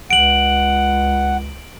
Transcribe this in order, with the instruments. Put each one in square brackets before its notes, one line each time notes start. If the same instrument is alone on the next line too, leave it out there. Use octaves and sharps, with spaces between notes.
[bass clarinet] C#2 [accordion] F#5 [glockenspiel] D7 F#7